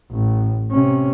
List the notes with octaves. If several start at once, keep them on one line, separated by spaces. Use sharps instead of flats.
A1 A2
C3 C#4